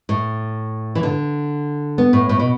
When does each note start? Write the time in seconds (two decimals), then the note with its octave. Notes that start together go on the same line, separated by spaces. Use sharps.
0.09 A2
0.95 E3
1.03 D3
1.98 B3
2.13 A2
2.29 A2
2.39 B2